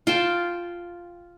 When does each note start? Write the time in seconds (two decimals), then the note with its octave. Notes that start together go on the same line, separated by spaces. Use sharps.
0.07 F4 G5 A5